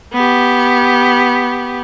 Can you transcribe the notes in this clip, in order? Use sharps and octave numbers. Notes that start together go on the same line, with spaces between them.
B3 G4